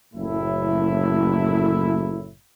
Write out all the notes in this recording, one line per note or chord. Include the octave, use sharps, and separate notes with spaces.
F#1 A2 E4